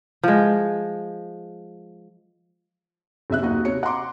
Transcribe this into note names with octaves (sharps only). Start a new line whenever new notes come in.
F3 G#3
F#1 C3 E5 F#6
D#2 A#2 D#4 F#4 D#5
C3 C#5 C#7
F#5 A#5 C6 D6